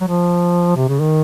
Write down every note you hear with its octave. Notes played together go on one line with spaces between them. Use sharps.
F#3
F3
C3
C#3
D#3